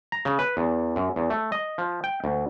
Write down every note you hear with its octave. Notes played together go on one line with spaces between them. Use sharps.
A#5
C#3
B4
E2
F#2
E2
A3
D#5
F3
G5
D2